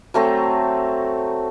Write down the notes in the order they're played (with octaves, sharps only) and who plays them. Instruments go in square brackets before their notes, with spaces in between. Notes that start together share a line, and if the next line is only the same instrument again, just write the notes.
[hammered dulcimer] F#3 A3 C4 A#5